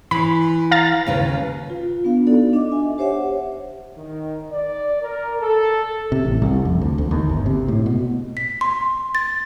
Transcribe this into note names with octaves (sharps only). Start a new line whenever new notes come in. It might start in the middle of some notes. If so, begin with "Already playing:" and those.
E3 B5
F5 A#5 A6
D#2 C#3 B4
F4
B3 D4 F5
D#4 F#4 A4 D5
D4 D#5 D6
E5 G#5
G4 C5 C#5 E5 F#5
D#3
D5
A#4
A4
C3
A1
C2
F2
D2
D2
D#2
G1
C3
A2
B2
B6
C6
A6